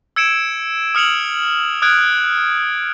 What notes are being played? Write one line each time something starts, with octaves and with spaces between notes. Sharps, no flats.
E6 G#6 C#7 D7 E7
D#6 F6 C#7 F7 F#7
D#6 F6 F#6 G#6 D7